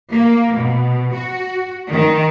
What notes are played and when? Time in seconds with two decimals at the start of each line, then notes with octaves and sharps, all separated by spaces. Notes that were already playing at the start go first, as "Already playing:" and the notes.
0.12 A#3
0.56 B2
1.14 F#4
1.89 D#3